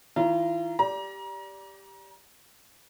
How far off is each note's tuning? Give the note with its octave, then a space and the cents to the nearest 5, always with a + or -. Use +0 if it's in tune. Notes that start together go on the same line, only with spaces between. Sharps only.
E3 -45 F4 -40 A#5 +0
G4 +0 D5 -20 A#5 +30